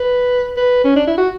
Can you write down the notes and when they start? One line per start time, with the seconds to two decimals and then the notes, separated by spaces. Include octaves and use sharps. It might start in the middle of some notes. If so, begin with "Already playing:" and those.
Already playing: B4
0.57 B4
0.84 C#4
0.96 D4
1.07 E4
1.18 F#4